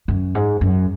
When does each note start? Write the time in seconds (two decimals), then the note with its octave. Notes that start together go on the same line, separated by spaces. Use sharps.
0.08 F#2
0.35 G#2
0.61 F#2